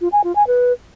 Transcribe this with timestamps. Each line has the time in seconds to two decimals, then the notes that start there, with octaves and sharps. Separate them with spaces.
0.01 F4
0.12 G#5
0.24 F4
0.36 G#5
0.47 B4